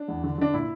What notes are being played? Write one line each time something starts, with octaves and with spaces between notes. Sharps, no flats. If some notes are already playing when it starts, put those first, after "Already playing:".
Already playing: D4
E2
D3
D3 D4
A#2 E4